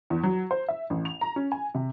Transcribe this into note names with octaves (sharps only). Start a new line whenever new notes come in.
E2
F#3
C5
E5
A1
F7
A#5
C#4
G#5
C3